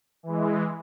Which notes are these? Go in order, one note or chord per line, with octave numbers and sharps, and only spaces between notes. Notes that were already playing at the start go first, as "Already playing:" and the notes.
E3 G#3